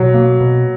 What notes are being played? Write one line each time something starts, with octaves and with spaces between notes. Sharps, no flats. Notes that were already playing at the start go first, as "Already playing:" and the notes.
Already playing: B2 F#3
A#3
B2